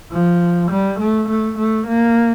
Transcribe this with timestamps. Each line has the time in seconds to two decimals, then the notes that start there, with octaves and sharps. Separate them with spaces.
0.12 F3
0.71 G3
0.99 A3
1.28 A3
1.58 A3
1.87 A#3